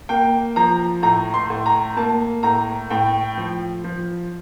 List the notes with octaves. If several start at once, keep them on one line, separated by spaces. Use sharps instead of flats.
A#3 G5
F3 A#5
A2 A#5
C6
A2
A#5
A#3 A5
A2 A#5
A2 G5
F3
F3